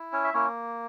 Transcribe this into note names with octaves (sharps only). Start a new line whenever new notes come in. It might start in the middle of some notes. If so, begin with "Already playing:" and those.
Already playing: E4
C#4 C#5
E5
A#3 C#4 E4 C#5